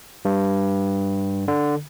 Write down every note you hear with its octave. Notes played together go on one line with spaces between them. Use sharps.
G2
D3